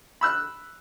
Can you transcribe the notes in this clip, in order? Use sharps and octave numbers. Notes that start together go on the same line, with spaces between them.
B5 E6 F#6